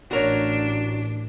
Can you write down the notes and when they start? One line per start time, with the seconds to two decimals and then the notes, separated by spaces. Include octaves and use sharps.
0.11 A1 D4 F#4 A#4 C#5